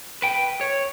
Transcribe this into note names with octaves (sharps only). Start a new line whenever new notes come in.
B4 G5
C#5